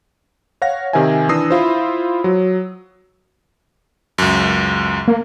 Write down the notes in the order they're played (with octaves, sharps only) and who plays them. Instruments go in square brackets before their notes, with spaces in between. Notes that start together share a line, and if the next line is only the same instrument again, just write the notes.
[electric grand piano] C#5 F5 F#5 A#6
C3 D#3 A#4 E5 G#5
E3 D4 D#6 E6 A#6 C7
E4 F4 C5
F#3
C#2 F#2
[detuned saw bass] A#3